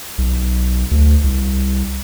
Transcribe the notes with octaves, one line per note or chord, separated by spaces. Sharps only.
B1
D2
C2